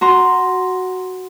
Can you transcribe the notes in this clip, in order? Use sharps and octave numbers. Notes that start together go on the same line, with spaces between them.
F#4 A#5 C6